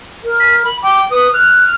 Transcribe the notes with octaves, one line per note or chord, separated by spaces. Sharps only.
A#4
B6
B5
G5 D6
B4 D#6
F6 F#6